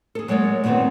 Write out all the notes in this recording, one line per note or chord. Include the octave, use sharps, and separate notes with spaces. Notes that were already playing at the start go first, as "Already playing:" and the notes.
G#4 A4
F#3 G#3 A#3 C#5 D5
F#2 A#2 D#3 B3 C4